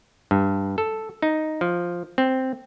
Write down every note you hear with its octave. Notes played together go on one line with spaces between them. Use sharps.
G2
A4
D#4
F3
C4